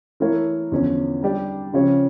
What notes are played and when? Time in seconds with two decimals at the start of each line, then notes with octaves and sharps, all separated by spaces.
0.20 E3 A3 E4 A#4 C#5
0.72 E2 D3 F3 C#4
1.23 G3 D4 G4
1.73 C#3 F3 C#4 G4 C#5